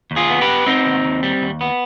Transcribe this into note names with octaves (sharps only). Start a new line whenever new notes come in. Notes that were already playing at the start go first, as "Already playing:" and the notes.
D#2
F4 G#4
B3
G4 B4
B3
B3 C4 D#4
D#2
D#2
G3
D#2
B3